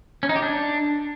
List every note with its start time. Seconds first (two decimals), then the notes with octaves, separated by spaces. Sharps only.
0.23 C#4
0.29 D#4
0.36 G4
0.42 D4